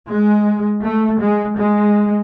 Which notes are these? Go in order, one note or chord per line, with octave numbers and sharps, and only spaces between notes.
G#3
A3
G#3
G#3